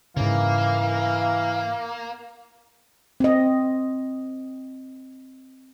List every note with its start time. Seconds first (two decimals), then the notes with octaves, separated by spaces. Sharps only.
0.17 G#2 C#3 E3 A#3 F5
3.20 C4 D#5